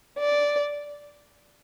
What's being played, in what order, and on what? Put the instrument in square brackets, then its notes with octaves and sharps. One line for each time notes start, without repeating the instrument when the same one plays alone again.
[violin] D5